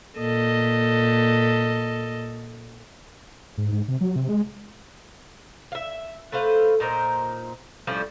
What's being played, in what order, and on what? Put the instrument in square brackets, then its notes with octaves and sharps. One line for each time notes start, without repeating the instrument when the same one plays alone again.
[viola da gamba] A#2 A4 D#5
[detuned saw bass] G#2
G#2
C3
F#3
C3
G#3
[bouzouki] E5 F5
A3 B4 C5 F5
A#2 D#4 A#4 C5
A2 F3 G3 C#4